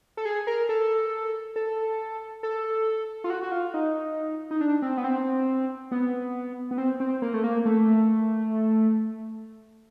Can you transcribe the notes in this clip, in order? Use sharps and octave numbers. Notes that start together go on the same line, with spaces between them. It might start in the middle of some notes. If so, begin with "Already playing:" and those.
A4
G#4
A#4
A4
A4
A4
F4
F#4
F#4
F4
D#4
D#4
D4
C4
B3
C4
B3
B3
C4
C4
A#3
A3
A#3
A3